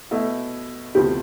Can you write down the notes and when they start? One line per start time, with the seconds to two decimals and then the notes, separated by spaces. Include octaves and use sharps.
0.11 B2 A3 E4
0.95 D2 C3 F3 B3 G4